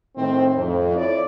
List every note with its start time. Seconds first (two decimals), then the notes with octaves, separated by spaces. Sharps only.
0.17 A2 D#3 C4
0.56 F2
0.96 E4 C#5 D5